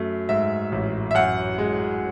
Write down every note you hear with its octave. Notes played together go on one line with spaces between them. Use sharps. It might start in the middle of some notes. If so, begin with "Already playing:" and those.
Already playing: F#2 A3
G#2 E5
A1
E5
F#2 F#5
G#3